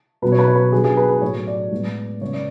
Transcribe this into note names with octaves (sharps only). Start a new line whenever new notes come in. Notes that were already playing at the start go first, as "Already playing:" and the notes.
B2 F#3 B3 B4
C#5
B4
C#5
B4
D3 F#3 B3 G#4
G#4
B4
B4
A2 F#3 A3 C#5
D5
A2 G#3 B3
C#3 G#3 B3 C#5
D5